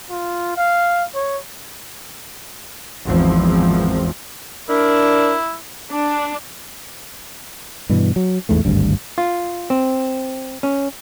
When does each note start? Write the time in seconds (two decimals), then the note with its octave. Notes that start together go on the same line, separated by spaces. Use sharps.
0.10 F4
0.57 F5
1.15 C#5
3.06 G#1 E2 F3 C4
4.69 D4 E4 A#4
5.93 D4
7.89 G2 B2 E3
8.16 F#3
8.49 A1 E2 G#2 A3
8.65 G#1 D2 G2
9.18 F4
9.70 C4
10.63 C#4